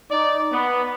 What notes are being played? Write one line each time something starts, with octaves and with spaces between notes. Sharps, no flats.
D#4 D5
B3